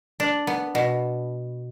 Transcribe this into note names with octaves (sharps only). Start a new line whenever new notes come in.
D4
B3
B2